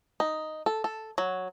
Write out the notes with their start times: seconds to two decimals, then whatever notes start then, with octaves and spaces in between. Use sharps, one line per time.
0.20 D#4
0.66 A4
0.84 A4
1.18 F#3